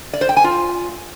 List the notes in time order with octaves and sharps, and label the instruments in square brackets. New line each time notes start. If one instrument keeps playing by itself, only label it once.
[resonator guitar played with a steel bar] D5
C5
G5
G#5
F4